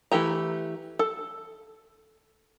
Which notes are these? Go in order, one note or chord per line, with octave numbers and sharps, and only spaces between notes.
E3 A3 G4 A#5
A4